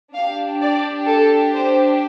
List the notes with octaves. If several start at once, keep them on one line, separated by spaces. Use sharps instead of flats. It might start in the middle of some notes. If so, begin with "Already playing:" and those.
D4 G4 F5
D5
A4
C5